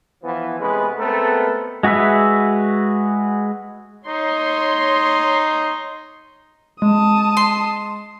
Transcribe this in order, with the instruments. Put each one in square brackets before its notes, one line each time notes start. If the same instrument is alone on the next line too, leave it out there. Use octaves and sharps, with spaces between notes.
[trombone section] E3 F3 B3
C3 G#3 A3 B3 C#4 B4
G#3 A3 B3 C4 A4 A#4
[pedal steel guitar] G#3 F#4 G#4 B4 E5
[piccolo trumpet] D#4 [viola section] C#5 C6
[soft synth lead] G#3 [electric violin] A5 D#6
[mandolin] C6